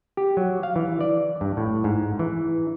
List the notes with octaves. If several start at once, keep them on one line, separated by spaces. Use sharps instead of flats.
G4
F#3
F5
E3
D5
G2
A2
G#2
E3